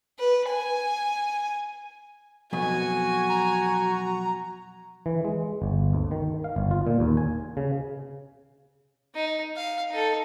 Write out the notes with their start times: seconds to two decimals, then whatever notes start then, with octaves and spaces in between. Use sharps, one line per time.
0.19 B4
0.49 G#5
2.53 B1 F2 B2 F#4 G#5
3.30 A#5
5.06 E3
5.25 G#3
5.62 G1
5.93 D2
6.11 D#3
6.44 F5
6.56 G1
6.71 F4
6.87 A#2
7.00 D#2
7.17 G#5
7.57 C#3
9.15 D#4
9.56 F5
9.91 D#4 A4